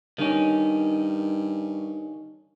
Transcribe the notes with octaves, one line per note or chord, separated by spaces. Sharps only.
G2 D#3 C#4